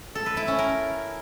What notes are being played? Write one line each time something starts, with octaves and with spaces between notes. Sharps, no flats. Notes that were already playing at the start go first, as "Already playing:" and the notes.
A4
B4
E4
C#4
A#4